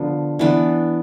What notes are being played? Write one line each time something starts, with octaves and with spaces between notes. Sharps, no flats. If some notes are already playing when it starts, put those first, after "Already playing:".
Already playing: D3 F3 B3 D4
E3 B3 D4